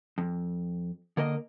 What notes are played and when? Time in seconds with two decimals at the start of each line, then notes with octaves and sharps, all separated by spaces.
0.18 F2
1.17 D3 A#3 A#4 D#5